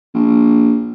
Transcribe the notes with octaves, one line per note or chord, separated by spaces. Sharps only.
A#1